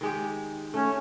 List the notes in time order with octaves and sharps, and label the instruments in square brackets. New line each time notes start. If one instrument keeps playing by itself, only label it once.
[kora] D#3 G#3 G4
[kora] A3 [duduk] C#4